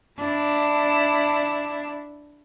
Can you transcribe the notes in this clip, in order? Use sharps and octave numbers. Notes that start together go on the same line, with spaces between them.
D4 E4